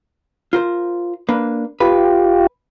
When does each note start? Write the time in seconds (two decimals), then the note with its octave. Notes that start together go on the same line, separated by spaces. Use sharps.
0.53 F4 A#4 C5
1.29 A#3 D4 B4
1.80 F4 G4 B4